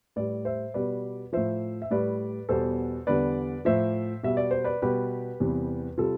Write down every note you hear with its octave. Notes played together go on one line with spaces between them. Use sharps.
A2 G3 B4 D5
C5 E5
B2 G3 B4 D5
A2 F3 C5 E5
E5
A2 G3 B4 D5
E2 B2 G3 A4 C5
E2 D3 G3 B4 D5
A2 F3 C5 E5
B2 G3 E5
D5
C5
B4 D5
B2 G3 G4 B4
E2 C3 E3 G3
C3 G3 F4 A4